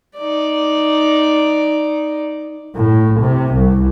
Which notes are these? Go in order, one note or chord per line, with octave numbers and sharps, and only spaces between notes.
D#4 D5
A2
C3
C2